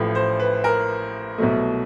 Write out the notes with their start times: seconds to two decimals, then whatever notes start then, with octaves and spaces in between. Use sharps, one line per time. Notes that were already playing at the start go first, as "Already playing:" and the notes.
Already playing: A1 A2 F3 A3
0.15 C5
0.39 B4
0.64 A#4
1.38 C2 B2 F#3 A3